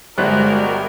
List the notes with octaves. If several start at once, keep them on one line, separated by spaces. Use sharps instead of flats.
G1 G#3 F#4 G4 A#4 C5 D5 F#6